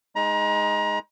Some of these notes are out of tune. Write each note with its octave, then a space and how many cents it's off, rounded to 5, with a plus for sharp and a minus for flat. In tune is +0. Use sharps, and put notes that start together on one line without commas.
G#3 +0 D#4 +0 A#5 +30